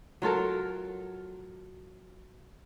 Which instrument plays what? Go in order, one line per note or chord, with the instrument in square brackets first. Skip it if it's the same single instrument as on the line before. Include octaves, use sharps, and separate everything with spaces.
[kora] F#3 F4 A4 A#4